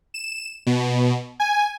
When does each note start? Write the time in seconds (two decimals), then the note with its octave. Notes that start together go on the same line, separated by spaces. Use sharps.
0.14 E7
0.67 B2
1.40 G#5